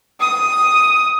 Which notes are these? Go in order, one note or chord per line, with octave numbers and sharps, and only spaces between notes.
D#6